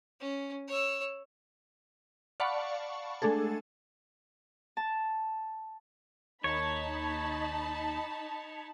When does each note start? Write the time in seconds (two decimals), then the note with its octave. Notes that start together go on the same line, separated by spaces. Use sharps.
0.20 C#4
0.68 C#5 E6
2.40 D5 F5 F#5 A5 B5 C#6
3.22 G#3 A3 D4 G#4 A4
4.77 A5
6.44 D#2 D#4 C#5 A5 B5